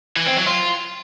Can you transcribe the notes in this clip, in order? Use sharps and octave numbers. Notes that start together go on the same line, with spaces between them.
E3
C4
F#3
F4